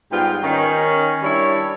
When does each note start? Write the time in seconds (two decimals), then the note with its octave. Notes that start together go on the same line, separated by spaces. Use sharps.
0.12 G#2 G3 B3 F4 G5
0.43 D#3 C#4
1.23 G3 D4 E4 C#5